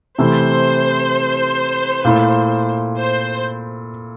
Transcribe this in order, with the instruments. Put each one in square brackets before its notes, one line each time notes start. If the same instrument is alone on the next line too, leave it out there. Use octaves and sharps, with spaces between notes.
[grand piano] C3 E3 A3 E4 [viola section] C5
[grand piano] A#2 A3 E4
[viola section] C5